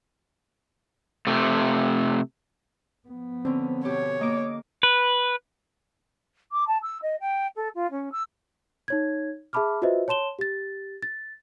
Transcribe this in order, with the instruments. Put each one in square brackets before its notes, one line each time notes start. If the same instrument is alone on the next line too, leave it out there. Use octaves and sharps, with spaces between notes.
[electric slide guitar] C3 A3
[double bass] F3 B3
[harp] D3 C#4 [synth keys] C4
[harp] B2 G4 [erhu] C#5
[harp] A#3 [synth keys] D#5 D6
[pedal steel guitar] B4
[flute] D6
A5
E6
D#5
G5
A4
F4
C#4
E6
[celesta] D#4 C#5 G#6
G#4 E5 A5 B5 D6 F6
F4 F#4 B4 C5 D#5 E5
C#5 A5 C6 E7 G7
G4 A6
A6